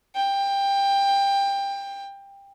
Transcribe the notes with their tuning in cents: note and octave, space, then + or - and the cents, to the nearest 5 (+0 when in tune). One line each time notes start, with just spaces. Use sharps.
G5 +20